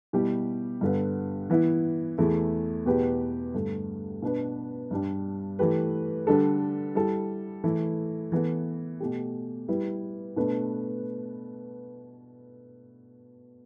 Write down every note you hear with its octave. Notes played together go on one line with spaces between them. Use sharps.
B2 G3 E4 G4
G2 D3 B3
E3 B3 E4
E2 E3 A3 E4
E2 B2 B3 G4 B4
G2 D3 A3
B2 B3 D4 B4
G2 G3 D4
E3 A3 G4 B4
D3 G3 D4 A4
G3 E4 A4
E3 A3 E4
E3 B3 E4 A4
B2 A3 G4
G3 E4 B4
B2 A3 D4 B4